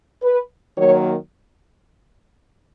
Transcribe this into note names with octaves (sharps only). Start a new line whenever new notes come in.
B4
D#3 F#3 A#3 C#5